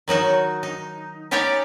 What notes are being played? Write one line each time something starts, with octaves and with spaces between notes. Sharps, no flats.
D#3 F#3 D#4 F#4
D#4
C#4 D#4 G4 C#5 D5 G5